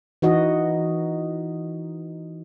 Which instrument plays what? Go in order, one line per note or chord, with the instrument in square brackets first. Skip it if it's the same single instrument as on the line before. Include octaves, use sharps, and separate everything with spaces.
[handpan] E3 D#4 F#4 D#5